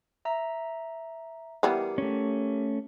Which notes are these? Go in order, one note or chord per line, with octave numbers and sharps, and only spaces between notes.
E5 A#5
E3 G3 B3 G4 A#4
A3 C#4